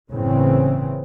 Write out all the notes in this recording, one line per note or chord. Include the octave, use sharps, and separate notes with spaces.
F#1 A2 C#3 E3 C4